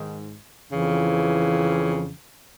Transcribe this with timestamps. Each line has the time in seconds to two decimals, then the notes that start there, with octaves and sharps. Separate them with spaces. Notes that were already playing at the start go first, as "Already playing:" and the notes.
Already playing: G#2 D#3
0.71 F2 C#3 E3